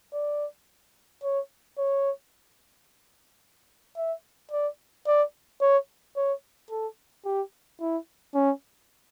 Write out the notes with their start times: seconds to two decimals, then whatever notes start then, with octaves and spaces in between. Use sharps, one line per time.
0.13 D5
1.23 C#5
1.78 C#5
3.97 E5
4.51 D5
5.07 D5
5.61 C#5
6.16 C#5
6.70 A4
7.25 G4
7.81 E4
8.34 C#4